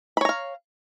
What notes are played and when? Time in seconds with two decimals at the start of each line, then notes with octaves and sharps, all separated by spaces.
0.17 B5
0.21 C#5
0.25 A#5
0.29 F5